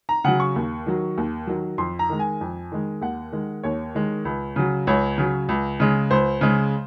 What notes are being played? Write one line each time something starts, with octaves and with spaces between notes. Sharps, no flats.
A#5
C#3 F#3 F#5
C#6
D#2
D#3 F#3
D#2
D#3 F#3
F2 C6
A#5
D#3 G#3
G#5
F2
D#3 G#3
D#2 F#5
D#3 G#3
D#2 C#5
D#3 G#3
C#2
C#3 F#3
C#2 C#5
C#3 F#3
C#2
C#3 G#3
C#2 C5
C#3 G#3